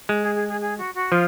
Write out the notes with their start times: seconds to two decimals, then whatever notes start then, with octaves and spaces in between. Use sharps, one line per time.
0.09 G#3
0.22 G#4
0.35 G#4
0.48 G#4
0.61 G#4
0.78 F#4
0.95 F#4
1.12 F3 F4